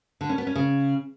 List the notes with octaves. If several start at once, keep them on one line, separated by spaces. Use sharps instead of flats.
D3
C#4
B3
C#4
C#3